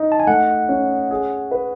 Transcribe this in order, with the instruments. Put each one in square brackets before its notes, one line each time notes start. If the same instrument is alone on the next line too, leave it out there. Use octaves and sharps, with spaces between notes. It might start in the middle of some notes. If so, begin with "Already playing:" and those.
Already playing: [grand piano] D#4
[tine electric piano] A5
G#5
[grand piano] A3 [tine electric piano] F#5
[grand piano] C#4
G#4
B4